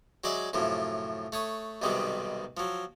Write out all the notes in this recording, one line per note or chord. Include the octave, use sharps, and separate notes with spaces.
F#3 G#3 D5 E5
F#2 A2 C3 F3
A3 C#5 D#6
B1 G#2 C3 D#3 G3 B3
F3 F#3